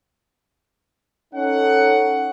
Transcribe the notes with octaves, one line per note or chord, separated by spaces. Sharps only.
C#4 D#4 A4 F#5